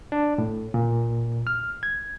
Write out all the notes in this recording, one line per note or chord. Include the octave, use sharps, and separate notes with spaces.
D4
A2
A#2
F6
G#6